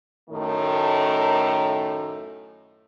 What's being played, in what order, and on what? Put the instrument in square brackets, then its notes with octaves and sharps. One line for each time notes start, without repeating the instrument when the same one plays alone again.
[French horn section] F#2 A2 D#3 A3